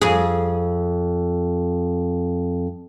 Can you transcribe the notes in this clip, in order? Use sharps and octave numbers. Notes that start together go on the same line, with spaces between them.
F2 G#4